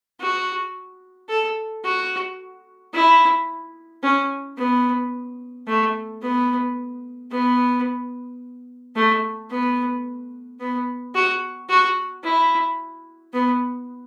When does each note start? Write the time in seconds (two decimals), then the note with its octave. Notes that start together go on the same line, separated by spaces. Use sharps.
0.20 F#4
1.29 A4
1.84 F#4
2.93 E4
4.03 C#4
4.57 B3
5.67 A3
6.22 B3
7.31 B3
8.95 A3
9.50 B3
10.60 B3
11.15 F#4
11.69 F#4
12.23 E4
13.33 B3